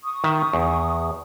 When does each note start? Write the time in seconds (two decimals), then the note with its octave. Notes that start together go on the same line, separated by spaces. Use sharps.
0.04 C#6 D#6
0.24 D#3 E5
0.53 E2